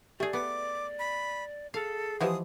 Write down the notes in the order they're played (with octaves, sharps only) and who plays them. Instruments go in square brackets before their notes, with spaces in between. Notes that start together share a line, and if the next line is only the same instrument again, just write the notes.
[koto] A3 G#4 [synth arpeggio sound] G4 [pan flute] D5
[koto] B3 [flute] D6
[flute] B5
[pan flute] G#4 [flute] A4 [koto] F5
[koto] E3 F3 G#3 [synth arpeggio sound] G4 F#5 [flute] D#6